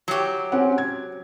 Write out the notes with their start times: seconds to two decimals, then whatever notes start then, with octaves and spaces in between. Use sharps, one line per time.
0.08 F#3 G4
0.52 C4 C#4 F#5
0.78 G#6